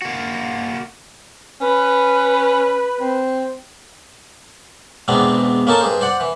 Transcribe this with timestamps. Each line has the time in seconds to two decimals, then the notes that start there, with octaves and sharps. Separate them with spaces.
0.02 A#3 F#4
1.61 C#4 B4
3.00 C4
5.08 E2 G#2 B2 B3 C4 D4
5.67 A#3 C#4 D#4 A4 A5
5.81 G2 G#4 C5
6.01 C5 D5 F#5
6.20 E3